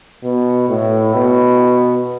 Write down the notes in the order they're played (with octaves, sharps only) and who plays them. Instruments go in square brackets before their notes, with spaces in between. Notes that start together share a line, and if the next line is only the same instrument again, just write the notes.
[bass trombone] B2
A2
B2